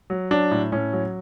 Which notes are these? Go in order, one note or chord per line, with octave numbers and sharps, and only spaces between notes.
F#3
F#3 D4
A2
A2 C#4
F#3